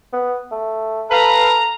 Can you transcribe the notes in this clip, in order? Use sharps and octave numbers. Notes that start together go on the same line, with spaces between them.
B3
A3
A4 B4 F5 A#5